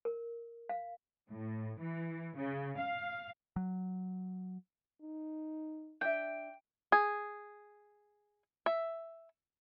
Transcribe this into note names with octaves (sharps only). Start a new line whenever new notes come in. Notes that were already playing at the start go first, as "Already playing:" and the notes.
A#4
F5
A2
E3
C#3
F5
F#3
D#4
D4 E5 G5
G#4
E5